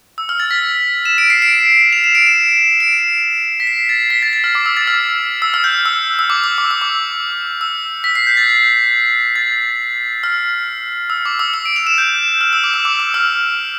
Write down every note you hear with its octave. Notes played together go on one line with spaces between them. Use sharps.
E6
F6
A6
B6
E7
D7
C7
D7
F7
E7
D7
E7
D7
B6
C7
A6
B6
A6
A6
F6
D6
E6
A6
F6
E6
F6
G6
E6
E6
D6
E6
D6
E6
D6
E6
B6
C7
G6
A6
A6
F6
E6
D6
E6
E6
D7
F7
E7
G6
F6
E6
D6
E6
D6
E6
F6